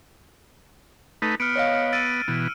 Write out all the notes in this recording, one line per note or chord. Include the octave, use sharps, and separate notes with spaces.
A3 D#4 B4
B3 F6 C#7 D7
C#5 D#5 F5
E6 A6 D7 D#7
B2 E3